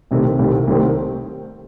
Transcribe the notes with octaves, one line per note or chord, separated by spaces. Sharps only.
C2 C3 D#3 A3 C4
C2 C3 D#3 A3 C4
C2 C3 D#3 A3 C4